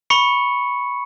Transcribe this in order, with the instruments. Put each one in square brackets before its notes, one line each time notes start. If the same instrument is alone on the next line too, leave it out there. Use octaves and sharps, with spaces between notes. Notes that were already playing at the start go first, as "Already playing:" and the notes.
[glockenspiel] B5 C#6 C#7